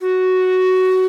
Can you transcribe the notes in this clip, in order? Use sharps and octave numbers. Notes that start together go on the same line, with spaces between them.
F#4